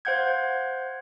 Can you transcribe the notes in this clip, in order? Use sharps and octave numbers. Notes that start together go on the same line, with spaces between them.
C5 F5 F#5 G6 G#6